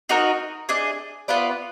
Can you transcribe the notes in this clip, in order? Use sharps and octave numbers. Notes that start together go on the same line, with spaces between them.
D#4 F#4 A#4 D#5
D4 G#4 D#5
B3 F4 B4 D5